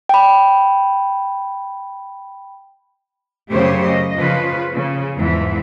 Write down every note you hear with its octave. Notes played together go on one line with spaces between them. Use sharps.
G5 B5
F#2 C#3 A3 G4 C5 C#5
D#5
C#3 F3 F4 B4
C#3
E2 G#2 E3 F3